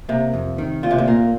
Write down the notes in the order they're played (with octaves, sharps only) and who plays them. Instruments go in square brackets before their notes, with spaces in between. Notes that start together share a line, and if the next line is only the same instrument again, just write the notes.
[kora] C3 [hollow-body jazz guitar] A#3
[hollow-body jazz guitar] F2
D#3
[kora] A#2 [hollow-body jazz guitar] F4
[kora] C3
A#2
[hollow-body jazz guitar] A#3